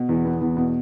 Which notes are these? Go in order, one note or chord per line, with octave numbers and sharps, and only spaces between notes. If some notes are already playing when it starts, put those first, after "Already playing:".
Already playing: B2
E2
B3
E2
B2